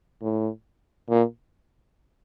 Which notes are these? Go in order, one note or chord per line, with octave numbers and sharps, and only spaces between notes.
A2
A#2